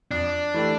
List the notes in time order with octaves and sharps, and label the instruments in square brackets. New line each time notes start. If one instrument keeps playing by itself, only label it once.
[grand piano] F2 [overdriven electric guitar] D4
[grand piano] E3 A3 E4 G4